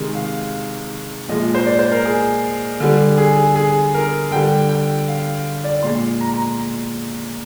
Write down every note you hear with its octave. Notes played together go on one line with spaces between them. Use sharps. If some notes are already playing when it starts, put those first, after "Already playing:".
Already playing: C3 D#3 G#3
F5
A#2 F3 G#3 D#5
C5
D5
C5
A#4
G#4
D3 G3
G#4
G#4
G#4
A#4
D3 G3 G5
G5
F5
D5
A#2 G#3 C6
A#5
A#5